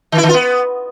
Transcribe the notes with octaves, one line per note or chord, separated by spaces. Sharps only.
D#3
E4
D#3
F4
B3